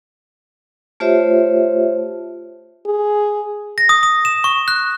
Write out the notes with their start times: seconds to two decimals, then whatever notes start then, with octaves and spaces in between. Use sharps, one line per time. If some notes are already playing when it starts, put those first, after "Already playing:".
1.00 A3 F4 G4 C5 C#5 E5
2.86 G#4
3.78 A#6
3.89 D#6
4.03 D#6
4.25 E7
4.44 C#6
4.68 F#6